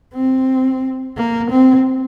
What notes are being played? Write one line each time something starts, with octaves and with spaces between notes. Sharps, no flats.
C4
A#3
C4